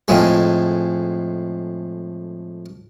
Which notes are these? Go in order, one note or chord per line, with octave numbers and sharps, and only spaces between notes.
F2 A2 G#3